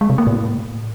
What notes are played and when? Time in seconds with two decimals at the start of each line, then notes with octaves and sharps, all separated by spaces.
0.01 G#3
0.10 C3
0.18 A#3
0.27 A2